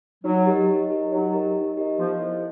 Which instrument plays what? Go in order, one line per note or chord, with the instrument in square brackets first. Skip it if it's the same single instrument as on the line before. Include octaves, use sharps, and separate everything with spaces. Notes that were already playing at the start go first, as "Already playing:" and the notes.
[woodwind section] F#3 [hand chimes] D#4
[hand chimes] G4 A#4 D#5
D#4
G4 A#4 D#5
[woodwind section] F#3 [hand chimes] D#4
[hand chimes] G4 A#4 D#5
D#4
G4 A#4 D#5
[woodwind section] F3 [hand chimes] B3
[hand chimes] E4 A4 C5